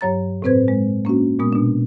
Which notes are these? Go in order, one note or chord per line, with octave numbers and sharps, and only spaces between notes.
G2 F#3 C#5 A#5 A6
A2 C3 C4 B4 C5 G#6
G#3
A#3 C#4 D4 F#4
A#2 G#3 B3 D#6
B2 D4